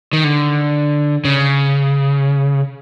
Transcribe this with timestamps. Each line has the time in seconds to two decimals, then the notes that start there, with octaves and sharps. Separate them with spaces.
0.13 D#3
0.24 D3
1.25 C#3